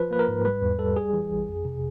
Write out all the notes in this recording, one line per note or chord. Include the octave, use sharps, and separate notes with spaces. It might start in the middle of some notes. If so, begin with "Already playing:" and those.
Already playing: F3 B4
A#3 B4
A#4
G#2
G3 B4
E2
G3 A4
G3 G#4
E3
A1
F2
C3